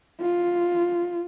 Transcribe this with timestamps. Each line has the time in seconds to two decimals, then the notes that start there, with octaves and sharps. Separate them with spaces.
0.21 F4